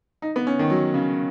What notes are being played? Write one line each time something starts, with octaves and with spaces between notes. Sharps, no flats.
D#4
B3
C#4
D#3
F#3
C#3